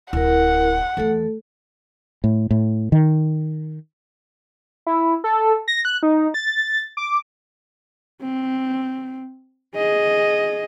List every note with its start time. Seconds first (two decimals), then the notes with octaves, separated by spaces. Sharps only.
0.13 D1 E4 A#4 F#5
0.97 E2 E3 A3 A4
2.24 A2
2.51 A2
2.92 D#3
4.87 E4
5.24 A4
5.68 A#6
5.85 F#6
6.03 D#4
6.34 A6
6.97 D6
8.22 C4
9.76 G#4 D#5